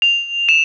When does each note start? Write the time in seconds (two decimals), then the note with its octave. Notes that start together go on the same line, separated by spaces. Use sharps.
0.02 F7
0.49 E7